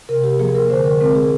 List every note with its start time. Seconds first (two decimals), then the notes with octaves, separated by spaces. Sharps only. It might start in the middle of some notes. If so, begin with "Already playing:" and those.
0.09 C3 A#4
0.24 G4
0.39 F3 A#3 G#4
0.55 A#4
0.70 D3 C5
0.85 A#4
1.01 G#3 C4 A#4
1.15 G#4